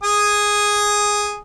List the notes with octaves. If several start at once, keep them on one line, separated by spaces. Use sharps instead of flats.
G#4 G#5 D#6